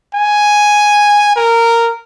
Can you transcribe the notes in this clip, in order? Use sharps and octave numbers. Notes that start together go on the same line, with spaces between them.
G#5
A#4